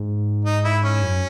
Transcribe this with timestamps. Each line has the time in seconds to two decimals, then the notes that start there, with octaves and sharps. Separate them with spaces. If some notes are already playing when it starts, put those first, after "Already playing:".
Already playing: G#2
0.45 D#4
0.65 E4
0.83 C#4
1.02 F#2